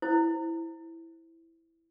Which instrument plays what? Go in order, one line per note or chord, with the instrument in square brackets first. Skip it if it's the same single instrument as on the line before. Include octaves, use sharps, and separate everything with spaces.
[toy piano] E4 C5